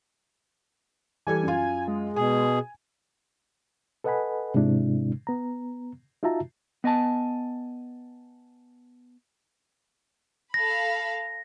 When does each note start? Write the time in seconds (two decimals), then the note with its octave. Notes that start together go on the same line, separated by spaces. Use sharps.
1.27 E3 G3 A4 G#5
1.43 F#2 F4
1.88 G#3
2.16 B2 G#4 G#5
4.04 A4 B4 D#5 F#5 G#5 B5
4.54 G#2 C3 G#3 D4 E4
5.27 B3 A#5
6.23 D#4 F4 F#4 E5 A5 A#5
6.84 B3 D#5 G#5 A5
10.54 A4 F5 B5 A#6